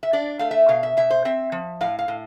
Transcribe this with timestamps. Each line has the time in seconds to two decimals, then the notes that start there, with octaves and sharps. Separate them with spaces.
0.03 E5
0.13 D4 D5
0.39 A3 F5
0.51 E5
0.69 B2 F5
0.83 E5
0.97 B2 E5
1.10 C5
1.25 C4 E5
1.52 F3
1.81 A2 F5
1.99 F5
2.08 A2